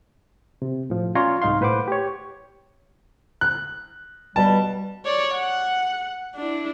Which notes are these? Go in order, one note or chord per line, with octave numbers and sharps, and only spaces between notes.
C3
A2 F3
C#4 F4 C#5 D5 A#5 C6
C2 G#2 D#4 F5 C6
A2 B4 C5 F#5 D6
G4 C#5
F#6
G2 B2 G3 A5
C#5 D5
F#5
D4 E4